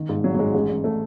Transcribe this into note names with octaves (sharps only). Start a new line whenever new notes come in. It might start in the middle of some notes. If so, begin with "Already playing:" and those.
Already playing: D#3
G#2
G#1 F#3
F#3
G#2 G#3
A1 G#3
A1
A3